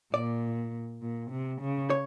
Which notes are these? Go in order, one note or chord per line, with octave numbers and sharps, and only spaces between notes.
A#2 D5
A#2
C3
C#3
C#5